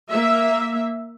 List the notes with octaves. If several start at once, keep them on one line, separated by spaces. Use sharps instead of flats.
A#3 E5